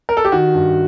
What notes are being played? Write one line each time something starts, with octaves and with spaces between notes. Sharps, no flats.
A#4
A4
G4
D#3 F#4
G2